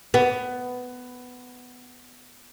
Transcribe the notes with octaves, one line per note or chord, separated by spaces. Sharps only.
B3